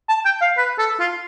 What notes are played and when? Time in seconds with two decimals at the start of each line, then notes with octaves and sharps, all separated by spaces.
0.09 A5
0.25 G5
0.41 F5
0.57 B4
0.79 A4
1.00 F4